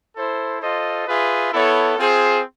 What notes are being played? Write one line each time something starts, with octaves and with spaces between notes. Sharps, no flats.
E4 A4 C5
F4 A4 C5 D#5
F4 G#4 B4 E5
B3 E4 A4 C#5
C4 F4 G#4 C5